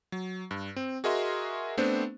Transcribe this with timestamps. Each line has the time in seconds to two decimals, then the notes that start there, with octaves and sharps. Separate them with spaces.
0.12 F#3
0.51 G2
0.76 C4
1.04 F#4 G#4 A#4 D#5 E5 C6
1.77 A3 B3 C4 D4 C5